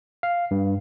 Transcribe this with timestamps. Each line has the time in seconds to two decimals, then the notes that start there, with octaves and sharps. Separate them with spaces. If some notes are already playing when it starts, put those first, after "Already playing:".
0.23 F5
0.51 G2